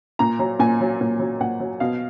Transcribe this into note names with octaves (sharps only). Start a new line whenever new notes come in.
A#2 A#5
F#3 A#5
A#2 G#5
F#3
A#2
F#3
A#2 F#5
F#3
B2 F5